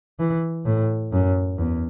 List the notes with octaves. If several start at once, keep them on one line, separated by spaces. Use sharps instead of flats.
E3
A2
F#2
E2